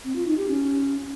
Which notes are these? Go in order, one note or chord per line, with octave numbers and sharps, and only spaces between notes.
C4
F4
D#4
G4
C#4